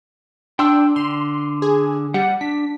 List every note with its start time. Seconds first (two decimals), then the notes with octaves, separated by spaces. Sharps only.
0.59 D4 G5 C6 E6
0.96 D3 C6
1.62 G#4
2.14 G3 F#5
2.41 D4 B6